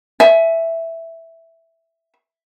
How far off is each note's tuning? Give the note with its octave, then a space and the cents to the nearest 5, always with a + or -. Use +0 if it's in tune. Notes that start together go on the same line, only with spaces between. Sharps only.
E5 +0 G#5 +30